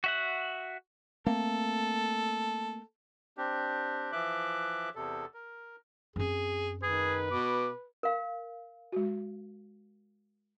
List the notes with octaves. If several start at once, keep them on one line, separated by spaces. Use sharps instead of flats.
F#4 E5 F#5
A3 A#3 C4 A4
C4 D4 G4
E3 F3 E5 D6 F#6
E2 C3 A4
A#4
F#2 C4 G#4
D#3 G#4 B4
B2 D6
A#4 F5
G#3 F#4